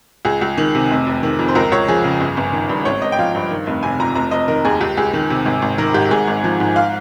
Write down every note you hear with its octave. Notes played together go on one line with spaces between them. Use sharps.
C#2 G#4
C#2
D#3
C3
F1
F1
D#3
F2
C5
C#2 A#4
C#2 C#5
F3 G#4
C#3
G1
G1
D#3
G2
G#1 C#5
G#1 D#5
G5
F3 F5
G2
D#3
F1
C3 G#5
F2 A#5
F1 A#5
F1 D#5
D#3 A#4
D#2 G#4
C#2 G4
C#2 G#4
D#3
C3
G#1
G#1
D#3 A#4
G#2 G4
G#1 G#4
G#1
F3
G#2
F5